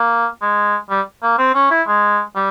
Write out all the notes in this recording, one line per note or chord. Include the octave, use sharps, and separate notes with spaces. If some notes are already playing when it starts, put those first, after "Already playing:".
Already playing: A#3
G#3
G3
A#3
C4
C#4
E4
G#3
G3